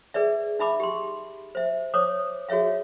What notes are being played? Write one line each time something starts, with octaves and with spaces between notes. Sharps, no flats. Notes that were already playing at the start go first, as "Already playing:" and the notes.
G#4 B4 D5 E5
D#4 E5 B5 D6
G4 C6
C5 E5
C5 C#5 D6 D#6
F#4 G#4 C#5 E5 F5